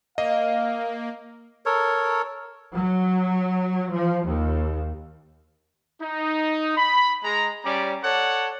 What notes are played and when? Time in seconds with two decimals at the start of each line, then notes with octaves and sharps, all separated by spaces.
0.18 A#3 D#5 F5
1.66 A4 A#4 C#5
2.75 F#3
3.93 F3
4.26 D#2
6.01 D#4
6.77 B5
7.23 G#3 A#5
7.63 G3 C#4 D5 A#5
8.03 A4 C#5 D5 F#5